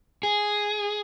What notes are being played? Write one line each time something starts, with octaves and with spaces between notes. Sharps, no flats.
G#4